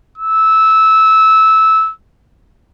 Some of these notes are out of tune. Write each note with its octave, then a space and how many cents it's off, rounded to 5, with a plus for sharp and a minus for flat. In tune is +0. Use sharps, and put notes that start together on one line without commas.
E6 -15